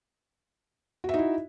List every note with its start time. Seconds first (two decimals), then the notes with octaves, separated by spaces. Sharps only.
1.04 F#4
1.09 E5
1.14 D#4
1.19 E4